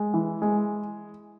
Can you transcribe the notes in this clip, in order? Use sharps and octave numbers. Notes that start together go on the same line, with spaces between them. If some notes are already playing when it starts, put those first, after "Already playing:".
Already playing: G#3
E3
G#3